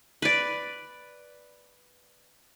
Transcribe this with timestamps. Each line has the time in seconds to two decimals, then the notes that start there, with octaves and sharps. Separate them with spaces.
0.22 B4 D5